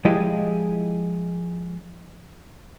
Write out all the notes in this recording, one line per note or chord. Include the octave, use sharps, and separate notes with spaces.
F3 G#3 E4 G4 G#4 D#5